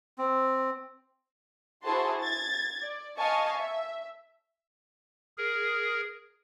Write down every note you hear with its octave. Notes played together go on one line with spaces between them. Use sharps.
C4
E4 F#4 G#4 C5 A5 C6
G#6 A6
D5
D#5 F5 G#5 A5 C#6
E5
G#4 A#4